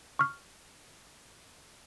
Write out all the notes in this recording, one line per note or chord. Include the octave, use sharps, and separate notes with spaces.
C#6 F6